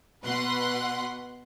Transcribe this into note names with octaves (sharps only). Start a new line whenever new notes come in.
B2 B4 F#5 C6 F#6